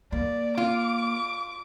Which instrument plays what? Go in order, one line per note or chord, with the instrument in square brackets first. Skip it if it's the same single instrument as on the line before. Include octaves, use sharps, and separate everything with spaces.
[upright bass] A#3 [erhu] D5
[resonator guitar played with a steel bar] F4 [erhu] D6